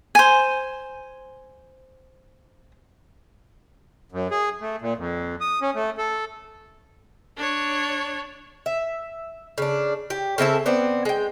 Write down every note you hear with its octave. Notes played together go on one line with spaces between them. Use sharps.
C5 G#5
F#2
G#4
A3
A#2
F2
D#6
C#4
A3
A4
D4 C#5
E5
C#3 D4
G4
C#3 C4 E4 A4
B3 C4 D5
G#3 G5